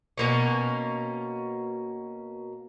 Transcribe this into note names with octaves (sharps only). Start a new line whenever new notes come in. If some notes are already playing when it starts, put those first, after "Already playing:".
B2 A#3 C#4